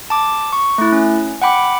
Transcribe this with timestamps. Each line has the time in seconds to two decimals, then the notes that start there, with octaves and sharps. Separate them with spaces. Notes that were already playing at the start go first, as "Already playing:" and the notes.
0.10 A5 D6
0.53 C#6
0.78 A3 E4
0.92 C#4
1.42 F#5 G5 B5 D6